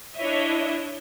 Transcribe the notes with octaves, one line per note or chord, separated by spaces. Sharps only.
D4 E4 C#5 D#5 E5